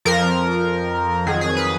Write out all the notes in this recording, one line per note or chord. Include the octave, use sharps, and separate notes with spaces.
F2 F3 A#4
F2 D#3 F#3 G#4
G#4
B4